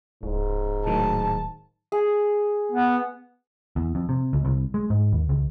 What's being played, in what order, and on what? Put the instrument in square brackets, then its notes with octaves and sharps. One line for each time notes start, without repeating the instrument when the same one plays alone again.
[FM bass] D1 [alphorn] G#2
[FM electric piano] A2 D#3 F#3 [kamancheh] A5
[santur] G#4
[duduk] B3
[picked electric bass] E2
F2
C3
C#2
C2
G#3
G#2
D#2
C#2